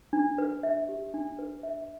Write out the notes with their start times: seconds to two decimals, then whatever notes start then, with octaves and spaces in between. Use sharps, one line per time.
0.13 D4
0.38 B4
0.63 E5
0.89 G4
1.14 D4
1.39 B4
1.63 E5